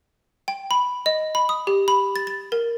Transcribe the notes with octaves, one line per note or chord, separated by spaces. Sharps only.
G5
B5
D#5
B5
D#6
G4
B5
A6
A6
A#4